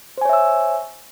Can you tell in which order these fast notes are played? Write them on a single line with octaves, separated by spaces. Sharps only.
C5 G#5 C#5 E5 E6